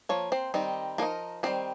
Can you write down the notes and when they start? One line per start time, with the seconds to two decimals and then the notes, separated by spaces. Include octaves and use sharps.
0.09 F3 A#3 C#5
0.32 C4 C5
0.54 D#3 G3 C4 D#4
0.98 F3 A#3 D#4 A#4
1.43 D#3 G3 A#3 C4 C5